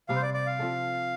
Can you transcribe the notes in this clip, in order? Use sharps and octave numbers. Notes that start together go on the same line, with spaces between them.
C3 G3 C4 F5
C5
D5
D5
F5
F3 C4 F4 A4